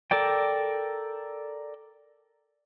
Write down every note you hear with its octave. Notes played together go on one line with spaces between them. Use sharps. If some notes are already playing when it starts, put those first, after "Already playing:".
A4 A#4 D5 G5